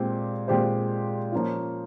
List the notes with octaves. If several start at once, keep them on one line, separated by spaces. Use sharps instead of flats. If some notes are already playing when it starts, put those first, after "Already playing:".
Already playing: A#2 G#3 C4 G4
A#2 G#3 C4 G4 C5
F3 A#3 C#4 F4